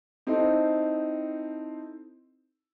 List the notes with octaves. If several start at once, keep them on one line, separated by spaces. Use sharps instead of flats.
C4 D#4 E4 A4 C5